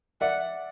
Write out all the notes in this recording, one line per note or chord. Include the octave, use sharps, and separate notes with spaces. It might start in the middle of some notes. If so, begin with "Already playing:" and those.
D5 E5 F#5